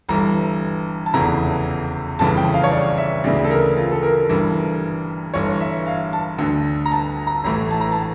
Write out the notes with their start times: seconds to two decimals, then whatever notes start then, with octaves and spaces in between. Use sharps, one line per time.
0.09 G1 G2 E3 A#5
1.06 A5
1.14 F1 E2 C#3 E3 A#5
2.19 G1 F2 C#3 E3 A5
2.37 G5
2.54 F5
2.64 C#5
2.72 D5
2.98 E5
3.24 D2 C#3 E3 D5
3.44 A4
3.51 A#4
3.77 F4
3.92 A4
4.03 A#4
4.29 G1 G2 E3
5.34 G1 G2 E3 C#5
5.60 E5
5.87 F5
6.13 A5
6.38 D2 D3
6.86 A#5
6.92 A5
7.27 A#5
7.44 A1 A2 E3 A#5
7.71 A5
7.81 A#5
7.92 A5